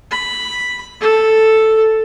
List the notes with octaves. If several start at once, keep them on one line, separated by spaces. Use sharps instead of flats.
B5
A4